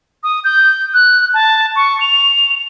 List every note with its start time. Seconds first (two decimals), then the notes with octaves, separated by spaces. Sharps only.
0.24 D#6
0.44 G6
0.94 F#6
1.34 A5
1.76 C#6
2.01 F7